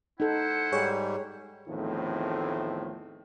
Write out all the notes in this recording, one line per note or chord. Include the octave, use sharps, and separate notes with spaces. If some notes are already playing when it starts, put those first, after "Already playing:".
D#4 E4 A4 C5 F#5
G#2 G3 G#4 C#5
E2 A2 D#3 F3 A3 C4